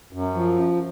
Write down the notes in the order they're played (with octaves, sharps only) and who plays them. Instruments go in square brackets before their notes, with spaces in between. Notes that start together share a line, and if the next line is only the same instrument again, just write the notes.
[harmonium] F#2
F3